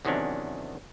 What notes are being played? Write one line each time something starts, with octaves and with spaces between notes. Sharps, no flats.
E2 C3 D#3 F#3 C#4 D4